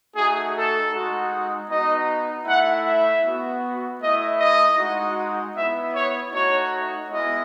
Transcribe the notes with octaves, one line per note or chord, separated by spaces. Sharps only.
A3 D#4 F#4 G#4
A4
G#3 D#4 F#4
B3 D#4 F#4 D#5
A3 E4 F#5
E5
B3 F#4
A3 E4 D#5
D#5
G#3 D#4 F#4
B3 E4 E5
C#5
A3 D#4 F#4 C#5
G#3 B3 E4 D#5